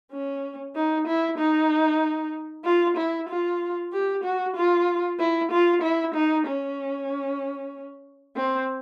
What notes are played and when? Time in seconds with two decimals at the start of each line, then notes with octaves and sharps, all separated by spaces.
0.12 C#4
0.75 D#4
1.07 E4
1.38 D#4
2.65 F4
2.97 E4
3.29 F4
3.93 G4
4.24 F#4
4.56 F4
5.20 E4
5.52 F4
5.82 E4
6.15 D#4
6.47 C#4
8.36 C4